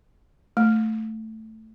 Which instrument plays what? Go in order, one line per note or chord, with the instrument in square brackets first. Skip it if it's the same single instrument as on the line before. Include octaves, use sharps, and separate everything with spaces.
[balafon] A3